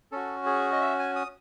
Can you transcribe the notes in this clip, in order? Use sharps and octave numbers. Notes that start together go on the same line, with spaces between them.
C#4 F#4 A4
G#4
D#5
E5
G#5
D#6